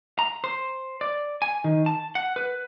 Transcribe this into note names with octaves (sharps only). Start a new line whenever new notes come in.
A#5
C5
D5
G#5
D#3
A5
F#5
B4